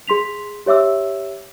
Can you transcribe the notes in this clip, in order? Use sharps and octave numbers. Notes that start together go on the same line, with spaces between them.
G#4 C6 B6 F7
G4 C#5 E5 D6 E6